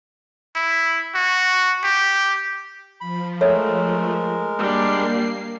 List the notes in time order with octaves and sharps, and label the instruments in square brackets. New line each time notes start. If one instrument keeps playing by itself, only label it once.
[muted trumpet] E4
F#4
G4
[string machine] F3 [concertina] B5
[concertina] G#3 A#4 [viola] A3 [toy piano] A4 C#5 E5
[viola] G3 D4 [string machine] A#3 C7